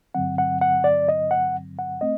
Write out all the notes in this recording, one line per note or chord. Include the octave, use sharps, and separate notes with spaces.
G2 D3 F#3 C4 F#5
F#5
F#5
D5
D#5
F#5
F#5
A3 C4 D#5